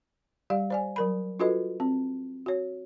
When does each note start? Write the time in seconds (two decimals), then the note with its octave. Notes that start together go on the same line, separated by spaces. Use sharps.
0.50 G3 G4 D5 F5
0.70 C5 D5 G#5
0.96 F#3 A#4 B5
1.40 D4 F4 F#4 A4 B4 D#5
1.80 C4
2.46 F#4 C#5